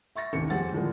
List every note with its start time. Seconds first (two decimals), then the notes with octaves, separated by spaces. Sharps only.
0.15 E5 C#6 A6 A#6
0.33 A1 D#2 C3 C#7
0.50 F2 G4 G#4 C5 F#5 A6
0.72 A2 D3 F3 G#3 A#3